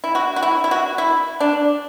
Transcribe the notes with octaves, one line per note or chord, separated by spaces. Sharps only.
E4
F#4
F#4
E4
E4
F#4
E4
D4